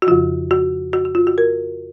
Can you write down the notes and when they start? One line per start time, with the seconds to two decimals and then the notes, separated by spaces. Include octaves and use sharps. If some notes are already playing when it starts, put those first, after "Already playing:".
0.02 F#4
0.07 F2 C#3 F3 F4
0.51 F#4
0.93 F#4
1.05 F#4
1.15 F4
1.27 F#4
1.38 A#4